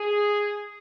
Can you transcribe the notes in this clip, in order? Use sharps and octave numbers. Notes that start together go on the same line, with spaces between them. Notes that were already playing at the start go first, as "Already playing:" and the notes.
Already playing: G#4